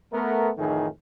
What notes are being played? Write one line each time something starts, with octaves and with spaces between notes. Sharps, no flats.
A3 B3 A#4
F2 A2 D#3 E3 D#4 G#4